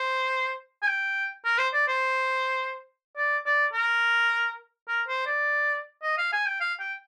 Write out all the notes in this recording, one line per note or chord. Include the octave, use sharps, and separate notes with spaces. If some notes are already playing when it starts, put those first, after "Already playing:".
Already playing: C5
G#5
G5
A#4
C5
D5
C5
D5
D5
A#4
A#4
C5
D5
D#5
F5
G#5
G5
F5
G5